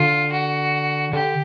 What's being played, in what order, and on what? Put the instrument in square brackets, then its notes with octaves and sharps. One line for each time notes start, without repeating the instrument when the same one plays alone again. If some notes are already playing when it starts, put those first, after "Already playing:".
Already playing: [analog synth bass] D3 [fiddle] F4
[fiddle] F#4
[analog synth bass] D3 [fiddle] G4